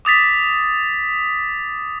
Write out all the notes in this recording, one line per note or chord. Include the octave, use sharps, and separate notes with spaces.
D6 D#6 A6 B6